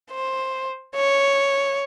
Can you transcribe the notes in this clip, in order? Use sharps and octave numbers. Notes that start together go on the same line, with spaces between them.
C5
C#5